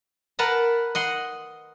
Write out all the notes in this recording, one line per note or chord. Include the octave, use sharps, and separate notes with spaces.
A#4 B4 F#5 A5 A#5
D#5 F#5 C6